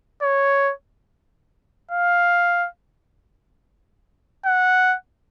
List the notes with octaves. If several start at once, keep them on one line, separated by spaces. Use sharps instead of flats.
C#5
F5
F#5